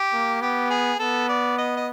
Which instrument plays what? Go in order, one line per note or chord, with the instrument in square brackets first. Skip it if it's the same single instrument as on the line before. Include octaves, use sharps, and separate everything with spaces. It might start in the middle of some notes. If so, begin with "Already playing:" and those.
Already playing: [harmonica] G4
[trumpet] A#3
[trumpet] B3 [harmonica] G4
[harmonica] G#4
[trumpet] B3 [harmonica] A4
[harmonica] D5
D#5
D#5